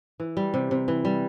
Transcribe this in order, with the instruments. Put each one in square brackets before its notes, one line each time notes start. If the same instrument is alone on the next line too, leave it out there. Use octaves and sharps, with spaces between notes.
[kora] E3
G3
C3
C3
E3
G3